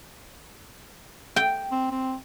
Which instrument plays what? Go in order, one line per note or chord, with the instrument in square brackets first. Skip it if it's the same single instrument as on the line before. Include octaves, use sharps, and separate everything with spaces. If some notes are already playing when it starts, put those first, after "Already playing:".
[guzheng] G5
[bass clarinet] C4
C4